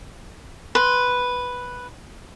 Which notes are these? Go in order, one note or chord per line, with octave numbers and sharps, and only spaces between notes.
B4 C6